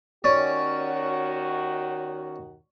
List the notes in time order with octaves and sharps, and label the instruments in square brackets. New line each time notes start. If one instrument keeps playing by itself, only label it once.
[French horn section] D#2 D#3 F#4 [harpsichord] C#4 D5